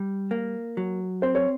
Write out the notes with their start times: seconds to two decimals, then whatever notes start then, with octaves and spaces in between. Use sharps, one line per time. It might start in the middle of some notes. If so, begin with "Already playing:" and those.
Already playing: G3
0.31 A#3
0.77 F#3
1.22 C4 C5
1.35 C#5